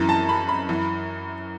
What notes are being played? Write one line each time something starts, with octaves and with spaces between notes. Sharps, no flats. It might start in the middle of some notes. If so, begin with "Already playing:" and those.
Already playing: F#2 E3
A5
B5
B5
F#2 E3